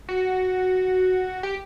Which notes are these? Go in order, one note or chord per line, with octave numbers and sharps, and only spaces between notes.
F#4
G4